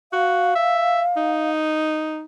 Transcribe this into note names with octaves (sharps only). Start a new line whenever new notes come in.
F#4 F5
E5
D#4